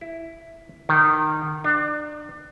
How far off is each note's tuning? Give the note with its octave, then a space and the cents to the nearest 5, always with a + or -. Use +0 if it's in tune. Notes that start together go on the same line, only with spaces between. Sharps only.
E4 +5
D#3 -20
D4 +30